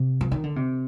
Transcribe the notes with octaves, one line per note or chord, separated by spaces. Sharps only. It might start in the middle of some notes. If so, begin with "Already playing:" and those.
Already playing: C3
F3
D#3
D3
C3